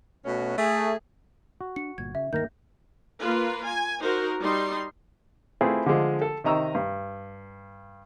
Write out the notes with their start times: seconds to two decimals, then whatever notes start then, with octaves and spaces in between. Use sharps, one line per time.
0.25 B2 A3 C#4 F#4
0.57 A3 G#4
1.61 F#4
1.76 D4 C#7
1.98 G1 G2 A#2 G#6
2.15 C#3 E5
2.33 D2 G2 D#3 A#3 A#4 G6 A#6
3.20 A#3 F4 B4
3.65 G#5
4.01 D#4 F#4 A#4 C5
4.40 G3 D#4 C6
5.61 A3 C4 E4 F4 G#4 B4
5.86 D3 F3 G#3 F4
6.22 A4
6.44 C3 D#3 D#5 A#5 C#6 E6
6.75 G2